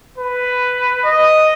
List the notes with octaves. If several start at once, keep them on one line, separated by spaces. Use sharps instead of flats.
B4
D#5